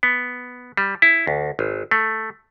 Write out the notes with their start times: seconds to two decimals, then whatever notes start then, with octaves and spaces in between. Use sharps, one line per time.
0.03 B3
0.77 G3
1.02 E4
1.27 D2
1.59 G#1
1.91 A3